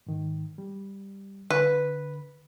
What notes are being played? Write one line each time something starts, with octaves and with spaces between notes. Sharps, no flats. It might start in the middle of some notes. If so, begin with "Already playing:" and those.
G#2 D#3
G3
D3 B4